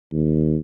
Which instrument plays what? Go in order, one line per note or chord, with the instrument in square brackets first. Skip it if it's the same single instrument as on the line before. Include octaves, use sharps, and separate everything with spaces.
[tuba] D#2